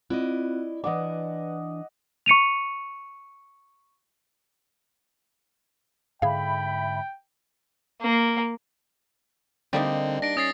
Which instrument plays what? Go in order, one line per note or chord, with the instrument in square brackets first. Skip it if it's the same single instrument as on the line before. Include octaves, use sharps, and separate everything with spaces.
[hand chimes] C4 F4 F#6 [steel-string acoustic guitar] E4 D5 D#5
[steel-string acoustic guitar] E3 D4 [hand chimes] B4 D5 [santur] D#5 F#5 D6
[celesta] C#6 C#7 D#7 F7
[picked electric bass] G#2 D3 [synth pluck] G#4 F5 [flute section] E5 B5 [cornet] G5
[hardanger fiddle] A#3
[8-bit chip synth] D3 C4 [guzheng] G3 A#3 D#4
[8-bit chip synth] D4 [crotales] A#6 D7
[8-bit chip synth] C#4 [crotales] D#6 A6 C7